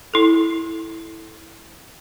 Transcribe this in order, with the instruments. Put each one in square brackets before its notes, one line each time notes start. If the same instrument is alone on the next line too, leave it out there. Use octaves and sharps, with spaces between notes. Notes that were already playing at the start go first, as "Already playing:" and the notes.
[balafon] E4 A4